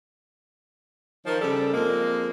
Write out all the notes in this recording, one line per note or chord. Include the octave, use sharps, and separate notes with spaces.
D#3 F3
C#3 G3 A4
F2 G#3 A#3